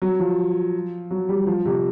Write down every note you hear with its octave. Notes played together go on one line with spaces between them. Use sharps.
F#3
F3
F#3
G3
F3
C3